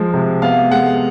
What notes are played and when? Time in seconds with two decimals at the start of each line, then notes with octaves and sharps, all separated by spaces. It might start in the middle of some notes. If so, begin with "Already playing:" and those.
Already playing: F3 G#3
0.14 C3
0.42 B3 F5
0.71 G#3 F#5